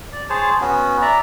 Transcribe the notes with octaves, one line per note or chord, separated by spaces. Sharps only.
D5
G#4 C5 C#5 A5
B3 C#4 F#4
D5 E5 A#5